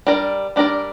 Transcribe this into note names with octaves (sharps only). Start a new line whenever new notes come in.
G3 D4 A#4 D5
G3 D4 A#4 D5